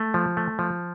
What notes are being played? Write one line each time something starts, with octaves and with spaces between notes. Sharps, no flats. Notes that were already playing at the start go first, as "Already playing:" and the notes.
Already playing: A3
F3
A3
F3